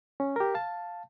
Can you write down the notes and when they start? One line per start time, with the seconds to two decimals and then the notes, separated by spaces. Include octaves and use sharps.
0.20 C#4
0.36 G4 A#4
0.54 F5 A5